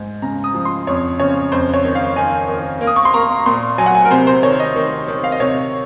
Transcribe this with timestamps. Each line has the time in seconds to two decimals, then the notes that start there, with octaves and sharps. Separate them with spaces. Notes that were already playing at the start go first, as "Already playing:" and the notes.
Already playing: G#2
0.22 C#3 A#5
0.44 D#6
0.54 F3
0.65 C6
0.87 F2 C#5
1.19 C#3 C#5
1.52 F2 C5
1.74 C#5
1.84 D#3
1.95 F5
2.16 D#3 G#5
2.49 D#3
2.81 A#3
2.87 D#6
2.96 C#6
3.05 C6
3.14 A#3 A#5
3.46 A#2 C6
3.78 F#3 G#5
3.86 F#5
3.95 G#5
4.05 A#4
4.11 C3 C5
4.27 C5
4.43 D#3 C#5
4.60 D#5
4.76 D#3
5.08 D#3
5.24 F5
5.32 D#5
5.40 C3 C#5